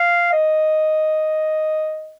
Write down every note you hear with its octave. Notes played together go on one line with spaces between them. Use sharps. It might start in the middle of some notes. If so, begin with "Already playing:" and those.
Already playing: F5
D#5